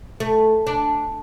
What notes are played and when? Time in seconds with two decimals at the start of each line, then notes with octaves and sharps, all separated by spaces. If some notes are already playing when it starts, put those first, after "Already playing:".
0.20 A3
0.67 D4